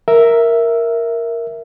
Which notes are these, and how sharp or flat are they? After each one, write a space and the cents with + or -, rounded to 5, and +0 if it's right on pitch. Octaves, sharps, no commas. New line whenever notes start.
A#4 +0 E5 +0